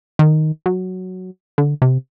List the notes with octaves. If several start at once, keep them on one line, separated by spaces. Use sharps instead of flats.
D#3
F#3
D3
C3